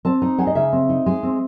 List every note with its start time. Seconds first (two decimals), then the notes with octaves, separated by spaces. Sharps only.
0.05 C4 A5
0.22 D#4
0.38 G#3 F#5
0.47 D#5
0.55 C#3 E5
0.72 C4
0.89 D#4
1.06 G#3
1.23 C4